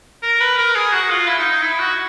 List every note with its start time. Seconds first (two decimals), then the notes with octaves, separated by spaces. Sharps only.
0.23 A#4
0.41 B4
0.58 A#4
0.75 G#4
0.92 F#4
1.11 F4
1.27 E4
1.39 D#4
1.51 D#4
1.63 E4
1.79 F#4